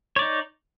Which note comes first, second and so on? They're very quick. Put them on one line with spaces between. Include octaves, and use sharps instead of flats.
C#5 D5 D#4